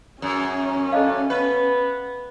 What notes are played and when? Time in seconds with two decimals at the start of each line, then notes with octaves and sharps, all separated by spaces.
0.22 F#2 C#4 G#4
0.92 D4 A4 D#5 F5
1.30 B3 B4